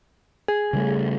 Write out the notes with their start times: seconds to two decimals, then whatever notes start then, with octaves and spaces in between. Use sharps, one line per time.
0.48 G#4
0.73 C#3 G3 A3